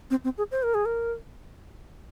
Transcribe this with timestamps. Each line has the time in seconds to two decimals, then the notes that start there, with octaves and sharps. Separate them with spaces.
0.11 C4
0.24 C4
0.38 G#4
0.51 C5
0.63 A#4
0.74 G#4
0.85 A#4